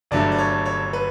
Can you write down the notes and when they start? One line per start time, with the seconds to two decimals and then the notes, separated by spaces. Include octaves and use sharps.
0.11 G1 G2 F#3 A3 D5
0.32 D5
0.39 C#5
0.65 C#5
0.93 B4